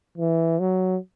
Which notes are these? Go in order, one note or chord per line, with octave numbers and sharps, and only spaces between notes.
E3
F#3